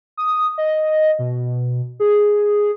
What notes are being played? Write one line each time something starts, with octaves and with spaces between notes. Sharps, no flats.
D#6
D#5
B2
G#4